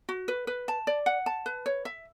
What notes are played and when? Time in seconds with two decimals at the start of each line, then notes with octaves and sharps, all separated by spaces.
0.09 F#4
0.28 B4
0.47 B4
0.68 A5
0.87 D5
1.06 F#5
1.26 A5
1.46 B4
1.66 C#5
1.85 E5